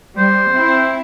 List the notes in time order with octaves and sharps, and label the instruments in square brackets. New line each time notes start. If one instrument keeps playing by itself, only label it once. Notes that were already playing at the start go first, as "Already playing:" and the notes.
[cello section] G3 [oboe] C5
[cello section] C4 E4